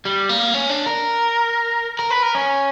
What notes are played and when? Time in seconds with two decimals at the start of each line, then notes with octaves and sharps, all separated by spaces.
0.05 G3
0.29 A#3
0.54 C#4
0.69 D4
0.86 A#4
1.99 A#4
2.11 B4
2.23 A#4
2.35 C#4